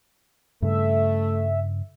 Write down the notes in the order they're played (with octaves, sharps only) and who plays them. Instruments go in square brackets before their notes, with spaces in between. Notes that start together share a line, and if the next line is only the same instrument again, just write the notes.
[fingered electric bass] G2 C#3 [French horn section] A3 [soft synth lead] E5